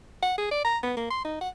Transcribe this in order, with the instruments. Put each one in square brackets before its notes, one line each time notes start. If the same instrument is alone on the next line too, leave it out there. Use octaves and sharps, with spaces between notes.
[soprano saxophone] F#5
G#4
D5
A#5
B3
A#3
C6
D#4
F#5